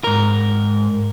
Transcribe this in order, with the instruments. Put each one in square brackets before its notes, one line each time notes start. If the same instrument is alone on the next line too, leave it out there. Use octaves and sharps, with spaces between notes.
[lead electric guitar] G#2 A#4